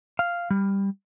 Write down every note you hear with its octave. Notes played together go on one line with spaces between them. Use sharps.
F5
G3